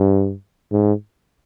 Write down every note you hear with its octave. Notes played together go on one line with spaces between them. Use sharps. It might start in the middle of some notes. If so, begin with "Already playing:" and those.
Already playing: G2
G#2